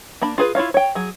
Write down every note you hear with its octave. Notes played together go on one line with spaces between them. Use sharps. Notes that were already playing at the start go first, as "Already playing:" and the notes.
A#3 D4 B5
F4 G#4 B4
E4 F4 C#5 F5
C#5 G5
F#3 G#4